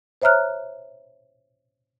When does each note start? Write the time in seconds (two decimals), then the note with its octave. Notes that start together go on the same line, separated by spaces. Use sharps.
0.22 C5 C#5 E5 A#5 F6 F#6